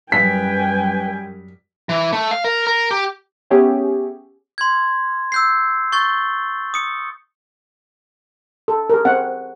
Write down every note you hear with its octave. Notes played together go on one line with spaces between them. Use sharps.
F#2 G3 B4 G5 G#5 B6
E3
A3
F5
A#4
A#4
G4
B3 C#4 G4 G#4 C#5 E5
C6 G#6
E6 G6 C7
C#6 G6 A6 G7
D#6 C#7
A4
G#4 A#4
C4 F#5